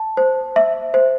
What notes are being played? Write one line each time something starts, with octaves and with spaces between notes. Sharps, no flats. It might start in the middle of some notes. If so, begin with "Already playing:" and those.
Already playing: A5
C5
E5
C5